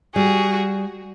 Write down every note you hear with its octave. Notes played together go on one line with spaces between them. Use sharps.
G3 F#4 G#4